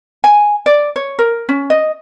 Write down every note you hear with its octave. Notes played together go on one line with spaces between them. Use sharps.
G#5
D5
C#5
A#4
C#4
D#5